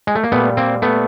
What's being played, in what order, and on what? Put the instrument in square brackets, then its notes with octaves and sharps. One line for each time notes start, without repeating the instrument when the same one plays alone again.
[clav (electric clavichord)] G#3
A3
A#3
A#2 G3 A3 B3
A#3 C4
A3 B3